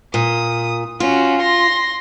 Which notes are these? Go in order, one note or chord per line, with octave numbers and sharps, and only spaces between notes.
A#2 D#6
C#4 F4 F#4
C6 A#6